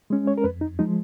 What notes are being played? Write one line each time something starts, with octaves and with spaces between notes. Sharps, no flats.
G#3 C#4
C#5
A#4
F2 B4
D#4
F3 G#3 D#4